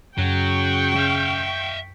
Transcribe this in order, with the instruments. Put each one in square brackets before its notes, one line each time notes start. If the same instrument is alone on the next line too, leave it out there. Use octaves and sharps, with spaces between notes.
[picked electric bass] F#2 [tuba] C#3 [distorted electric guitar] F#3 [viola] G5 C#6
[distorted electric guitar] E5 F5